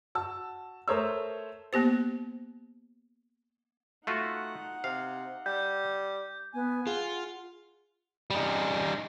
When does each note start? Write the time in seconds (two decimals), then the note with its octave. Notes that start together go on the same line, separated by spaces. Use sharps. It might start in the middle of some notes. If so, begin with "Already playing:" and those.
0.15 F#4 A5 E6
0.88 A3 A#4 C5 C#5 D#6 E6
1.73 A#3 B3 G4 C5
4.07 A3 D#4 F4 F#4 F#5
4.84 C3 F5
5.46 G3 G6
6.54 B3 G#5
6.87 F4 G#4 F#5
8.30 G3 D#4